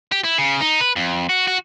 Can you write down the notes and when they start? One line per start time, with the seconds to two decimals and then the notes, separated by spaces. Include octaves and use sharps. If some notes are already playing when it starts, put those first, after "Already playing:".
0.12 G4
0.24 E4
0.38 C#3
0.61 D#4
0.80 B4
0.96 F2
1.29 F#4
1.47 F#4